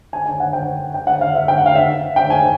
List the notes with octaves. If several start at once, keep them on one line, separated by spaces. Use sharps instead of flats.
G#5
G#5
F#5
G5
G5
F#5
F5
E5
G5
F#5
F5
E5
G5
G#5